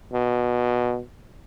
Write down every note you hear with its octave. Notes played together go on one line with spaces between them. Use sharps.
B2